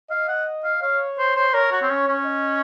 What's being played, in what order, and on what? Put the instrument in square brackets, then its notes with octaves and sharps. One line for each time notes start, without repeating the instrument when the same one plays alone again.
[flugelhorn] D#5 [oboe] F5
[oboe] F#5
F5
[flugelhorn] C#5 [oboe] F5
[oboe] C5
C5
[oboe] A#4 [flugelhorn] C#5
[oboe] F#4
C4
C#4
C#4
[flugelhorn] D#5